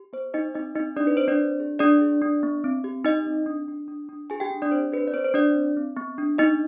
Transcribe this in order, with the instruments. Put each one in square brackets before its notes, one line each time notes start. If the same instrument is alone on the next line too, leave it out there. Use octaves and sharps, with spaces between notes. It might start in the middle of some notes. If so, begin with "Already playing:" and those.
Already playing: [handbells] G4
B3 C5
B3 D#4 D#5
C4 D#4 D#5
C4 D#4 D#5
D4 G4 D5
B4
C4 C5
D4 D5
D4
G#4
D4 G#4 D5
G#4
D4
B3
C4
G4
D#4 D#5
C4
D4
D4
D4
D4
F4 G#4 G#5
G4 G5
D4
D4 D5
C4 C5
G4 B4
D5
B3 C5
C5
D4 G4 D5
C4
C4
B3
D4
B3 D#4 D#5